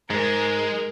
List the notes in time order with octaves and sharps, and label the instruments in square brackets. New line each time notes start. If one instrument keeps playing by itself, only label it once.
[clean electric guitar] G#2 [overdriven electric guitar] G#3 [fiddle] A#4